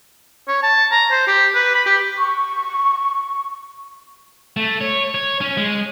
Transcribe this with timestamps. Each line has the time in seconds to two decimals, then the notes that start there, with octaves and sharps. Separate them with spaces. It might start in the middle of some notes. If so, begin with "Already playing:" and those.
0.48 C#5
0.63 A5
0.91 A#5
1.11 C5
1.27 G4
1.55 B4
1.75 B5
1.86 G4
2.17 C#6
4.56 A3
4.81 C#5
5.15 C#5
5.41 C#4
5.57 G#3